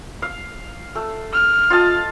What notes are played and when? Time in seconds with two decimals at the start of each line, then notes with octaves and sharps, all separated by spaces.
0.22 F5
0.95 A3
1.34 F6
1.70 F4 D#5 A5